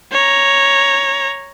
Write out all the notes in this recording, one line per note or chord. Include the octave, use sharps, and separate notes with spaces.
C#5 A#5